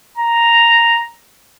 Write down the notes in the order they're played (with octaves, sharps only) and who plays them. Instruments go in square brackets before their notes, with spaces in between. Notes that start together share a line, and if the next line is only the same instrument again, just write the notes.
[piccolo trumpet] A#5